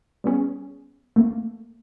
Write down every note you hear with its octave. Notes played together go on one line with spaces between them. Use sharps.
G3 B3 C#4 G#4
A3 A#3